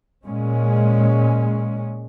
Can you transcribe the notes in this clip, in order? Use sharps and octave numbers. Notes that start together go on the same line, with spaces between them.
A#2 G#3 C#4